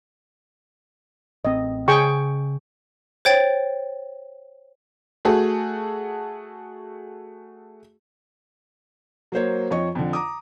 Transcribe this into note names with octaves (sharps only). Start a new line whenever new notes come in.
A1 C4 D#5
C#3 G#4 G5 C#6
C5 C#5 G5 A6
A3 F#4 G#4 A4
F#3 A#3 C5 C#5
F2 F3 C#5 D#5 C#6
F2 D3
A#5 D6 D#6